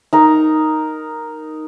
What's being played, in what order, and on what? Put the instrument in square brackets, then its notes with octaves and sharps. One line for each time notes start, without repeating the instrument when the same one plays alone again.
[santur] D#4 A#4